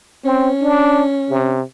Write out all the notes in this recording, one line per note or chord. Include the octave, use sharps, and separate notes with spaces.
C4 C#4
D4
C3